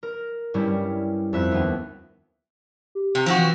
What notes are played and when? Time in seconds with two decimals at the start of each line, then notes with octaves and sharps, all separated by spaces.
0.03 A#4
0.54 G2 G3 C#4 E4
1.33 F2 E5 F#6
1.51 D#2 B3
2.95 G4
3.15 C3
3.26 F3 C4 F#4
3.38 E3